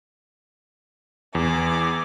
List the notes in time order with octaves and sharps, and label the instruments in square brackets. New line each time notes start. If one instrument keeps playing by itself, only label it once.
[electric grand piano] E2 [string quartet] G#5 D6